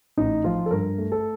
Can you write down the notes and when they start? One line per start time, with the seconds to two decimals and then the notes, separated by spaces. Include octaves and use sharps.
0.17 A1 D#4
0.44 F3 F4
0.66 A4
0.71 G2 A#4
0.98 A3
1.12 A4